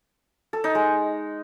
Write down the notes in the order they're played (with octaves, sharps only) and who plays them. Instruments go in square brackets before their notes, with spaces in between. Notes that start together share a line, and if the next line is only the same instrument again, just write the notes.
[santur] A4
D#4
G#3